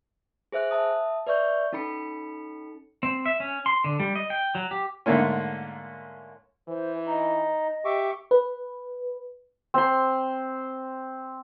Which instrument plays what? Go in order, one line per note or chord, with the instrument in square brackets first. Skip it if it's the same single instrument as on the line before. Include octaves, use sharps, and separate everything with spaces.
[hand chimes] G#4 C5 E5 F#6
E5 A5 D#6
B4 D5 E5 C#6 G6
C#4 D#4 A4 B5 C#7
[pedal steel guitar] C4
E5
C#4
C6
D3
G3
D#5
G5
F#3
G4
[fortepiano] G#2 D3 A3 A#3 C#4
[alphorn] E3 [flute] C5
[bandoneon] D#4 [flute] D#5
[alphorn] G4 [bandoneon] E5 C#6 D6
[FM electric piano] B4
[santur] C4 C6